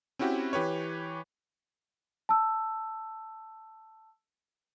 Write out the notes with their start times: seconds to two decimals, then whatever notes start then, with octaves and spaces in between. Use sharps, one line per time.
0.19 C4 C#4 E4 F#4 G4
0.53 E3 G4 B4 C#5
2.29 A5 E6